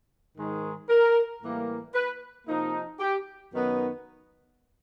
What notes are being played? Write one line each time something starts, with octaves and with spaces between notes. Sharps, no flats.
G#2 D#3 G#3
A#4
A2 E3 G3 A#3
B4
C3 F3 A#3 D#4
G4
F#2 D#3 F#3 B3 D#4